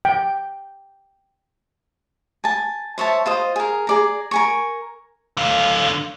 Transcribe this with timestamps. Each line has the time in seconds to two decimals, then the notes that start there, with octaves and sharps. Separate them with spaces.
0.05 G5
2.44 G#5 A5
2.98 C5 C#5 E5 A5
3.26 F4 C5 D#5
3.56 G#4 A#4
3.87 G#4 D5 A#5
4.31 A#4 G#5 C#6
5.37 D3 F5